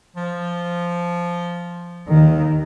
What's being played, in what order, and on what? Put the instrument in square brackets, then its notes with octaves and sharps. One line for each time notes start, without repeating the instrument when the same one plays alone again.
[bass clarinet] F3
[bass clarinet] D#2 [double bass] D#3